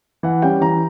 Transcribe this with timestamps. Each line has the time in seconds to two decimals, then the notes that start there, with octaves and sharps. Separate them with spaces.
0.23 E3 F#5
0.42 G3 C#4 G5
0.61 E3 A#5